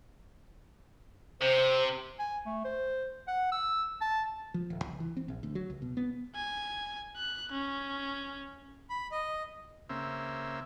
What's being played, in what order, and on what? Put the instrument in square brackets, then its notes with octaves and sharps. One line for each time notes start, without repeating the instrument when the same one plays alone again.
[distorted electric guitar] C3 [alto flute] C5
[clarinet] G#5
A3
C5
F#5
E6
A5
[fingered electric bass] F3
D1
C#2
E3
C4
A#1
D2
F#3
C#2
B2
B3
[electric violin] G#5
F#6
C#4
[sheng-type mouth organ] B5
D#5
[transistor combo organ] C#3 A#3 C4 E5